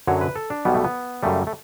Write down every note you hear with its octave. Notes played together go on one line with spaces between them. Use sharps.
F#2 D3 F#3 C#5
B4
A4
D4
B1 B2 G3 B3
A3
B3
F#2 C#3 G3 A3
A3